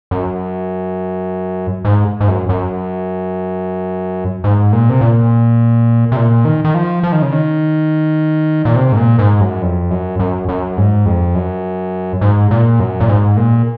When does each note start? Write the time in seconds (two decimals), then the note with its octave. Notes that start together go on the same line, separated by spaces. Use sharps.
0.11 F#2
1.85 G#2
2.21 G#2
2.28 F#2
2.49 F#2
4.44 G#2
4.73 A#2
4.90 C3
5.01 A#2
6.12 C3
6.17 A#2
6.45 D#3
6.64 D#3
6.74 F3
7.03 F3
7.12 D#3
7.22 C#3
7.32 D#3
8.65 A#2
8.76 C3
8.92 G#2
8.97 A#2
9.19 G#2
9.41 F#2
9.62 F2
9.91 F#2
10.19 F#2
10.49 F#2
10.77 G#2
11.06 F2
11.35 F#2
12.21 G#2
12.51 A#2
12.80 F#2
13.00 A#2
13.09 G#2
13.37 A#2